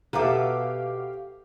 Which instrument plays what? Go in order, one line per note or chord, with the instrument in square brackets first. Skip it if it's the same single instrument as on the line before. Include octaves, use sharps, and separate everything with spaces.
[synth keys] B2 [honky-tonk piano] G4 F5 D6 [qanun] A4 B4 [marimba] E5 A#5